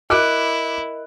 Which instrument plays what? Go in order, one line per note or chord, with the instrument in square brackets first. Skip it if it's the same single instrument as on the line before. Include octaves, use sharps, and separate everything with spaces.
[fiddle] E4 [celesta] A#4 D#5 [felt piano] D6 F#6 D7